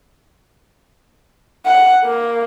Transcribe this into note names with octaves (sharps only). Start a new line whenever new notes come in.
F#5
A#3